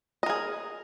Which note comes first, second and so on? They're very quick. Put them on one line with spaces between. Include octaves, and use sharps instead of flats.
D#5 A#4 G#4